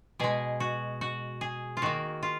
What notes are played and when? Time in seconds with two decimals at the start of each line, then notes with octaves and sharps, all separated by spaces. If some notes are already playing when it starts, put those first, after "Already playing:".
0.19 B2 G#3 G#4
0.60 F#4
1.01 F#4
1.41 G#4
1.77 F4
1.82 D#3 A#3 F#4
2.23 F4